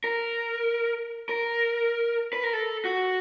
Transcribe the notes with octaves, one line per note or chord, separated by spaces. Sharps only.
A#4
A#4
B4
A#4
A4
F#4